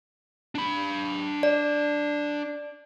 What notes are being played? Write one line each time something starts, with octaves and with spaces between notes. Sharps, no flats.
D4 B5
D5